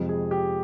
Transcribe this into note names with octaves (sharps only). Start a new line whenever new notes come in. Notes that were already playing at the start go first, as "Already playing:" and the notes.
Already playing: F2 C3 F3 G#3
G#4
G4